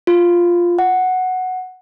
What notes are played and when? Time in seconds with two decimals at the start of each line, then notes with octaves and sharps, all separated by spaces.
0.07 F4
0.79 F#5